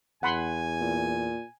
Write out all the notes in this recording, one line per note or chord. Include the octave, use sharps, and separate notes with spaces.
E2 F#5 G#5 B5 C6
A#2